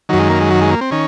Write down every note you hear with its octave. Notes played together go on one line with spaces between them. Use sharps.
F#2 D#3 F#3
G#3
A#3
G#3
F#3
G#3
A#3
C4
D#3 C#4